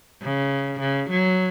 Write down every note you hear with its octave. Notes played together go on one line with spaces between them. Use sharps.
C#3
C#3
F#3